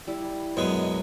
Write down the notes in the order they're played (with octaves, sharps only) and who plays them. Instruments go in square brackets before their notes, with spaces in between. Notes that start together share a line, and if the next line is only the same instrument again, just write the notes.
[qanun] G3 E4
[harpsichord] F#2 B2 G#3 [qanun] F#3